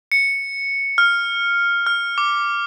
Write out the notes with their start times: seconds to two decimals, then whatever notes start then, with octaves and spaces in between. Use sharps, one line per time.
0.12 C#7
0.98 F6
1.86 F6
2.18 D6